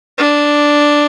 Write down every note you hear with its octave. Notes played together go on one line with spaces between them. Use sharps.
D4